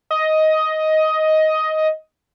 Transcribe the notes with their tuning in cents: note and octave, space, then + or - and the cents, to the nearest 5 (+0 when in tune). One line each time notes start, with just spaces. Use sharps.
D#5 +10